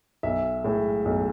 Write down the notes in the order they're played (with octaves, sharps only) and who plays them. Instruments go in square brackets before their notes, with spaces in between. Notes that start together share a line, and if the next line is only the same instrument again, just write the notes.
[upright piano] B1 E5
A2 G#3
B1